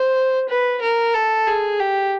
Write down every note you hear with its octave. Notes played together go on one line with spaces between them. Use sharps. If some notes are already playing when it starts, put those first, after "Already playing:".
Already playing: C5
B4
A#4
A4
G#4
G4